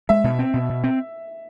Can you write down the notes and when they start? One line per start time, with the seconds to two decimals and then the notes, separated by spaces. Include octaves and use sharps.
0.09 G#3 E5
0.24 B2
0.39 C4
0.54 B2
0.69 B2
0.84 C4